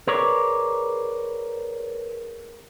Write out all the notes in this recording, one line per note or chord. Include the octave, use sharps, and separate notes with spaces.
G#4 A#4 B4 C#5 D5